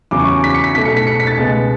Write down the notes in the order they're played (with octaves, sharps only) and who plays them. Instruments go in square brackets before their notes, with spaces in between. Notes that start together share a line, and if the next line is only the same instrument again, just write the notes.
[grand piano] E2 C#3 F#3 D6
C#6
D6
B6
C#7
B6
B2 B6
A3
C#7
B6
C#7
B6
A6
C#2 B2 G#3 B3